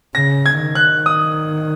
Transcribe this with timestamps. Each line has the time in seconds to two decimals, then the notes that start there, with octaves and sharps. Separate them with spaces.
0.15 C#3 A#6
0.46 G#6
0.60 D#3
0.75 F#6
1.06 D#6